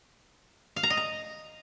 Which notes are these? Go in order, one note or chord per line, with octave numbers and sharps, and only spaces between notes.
F5
A#5
D#5
A#5